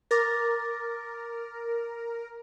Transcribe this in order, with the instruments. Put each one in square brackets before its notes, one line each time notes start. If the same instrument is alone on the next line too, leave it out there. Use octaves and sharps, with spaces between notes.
[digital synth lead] A#4 [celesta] D6 A6 A#6